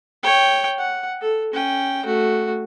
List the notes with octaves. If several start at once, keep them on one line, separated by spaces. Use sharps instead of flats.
C#5 G5
F#5
A4
C#4 G5
A3 F#4